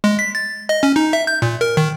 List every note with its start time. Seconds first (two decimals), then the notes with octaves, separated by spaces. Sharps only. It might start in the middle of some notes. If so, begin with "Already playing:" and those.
0.04 G#3
0.19 B6
0.35 A6
0.69 D#5
0.83 C#4
0.96 D#4
1.13 E5
1.27 G6
1.42 A#2
1.61 A#4
1.77 D#3